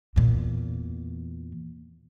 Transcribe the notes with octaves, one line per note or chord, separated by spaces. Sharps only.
E2 A#2